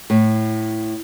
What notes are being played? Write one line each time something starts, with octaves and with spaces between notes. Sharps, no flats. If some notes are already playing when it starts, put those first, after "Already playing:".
A2